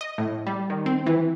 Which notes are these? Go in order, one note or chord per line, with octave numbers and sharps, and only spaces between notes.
D#5
A2
G3
D#3
C4
E3